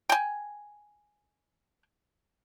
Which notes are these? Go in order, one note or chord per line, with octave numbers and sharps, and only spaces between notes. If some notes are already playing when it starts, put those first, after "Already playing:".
G5 G#5